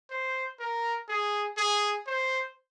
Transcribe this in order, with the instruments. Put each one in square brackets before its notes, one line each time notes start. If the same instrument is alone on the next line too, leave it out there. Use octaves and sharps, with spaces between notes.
[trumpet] C5
A#4
G#4
G#4
C5